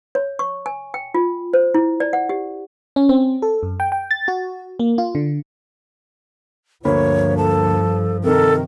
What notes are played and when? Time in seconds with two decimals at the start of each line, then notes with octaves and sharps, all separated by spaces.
0.15 C#5
0.39 C#6
0.66 G#5
0.94 G5
1.14 F4
1.53 C5
1.74 E4
2.00 D5
2.13 F#5
2.29 G4
2.96 C#4
3.09 C4
3.42 A4
3.63 F#2
3.80 G5
3.92 G5
4.11 A6
4.28 F#4
4.79 A#3
4.98 F4
5.15 D3
6.85 D2 G2 F3 A#3 C#5 B5
7.37 A4 A5
8.23 C3 D#3 A4 A#4